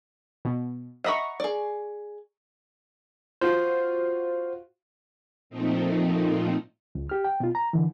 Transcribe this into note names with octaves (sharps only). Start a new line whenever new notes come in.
B2
D#5 E5 F#5 A#5 B5 C#6
G#4 D5
F4 F#4 C5
A#2 F3 A3 C4 D#4
C#2
G4 F6
G5
B2 F4
A#5
D3 E3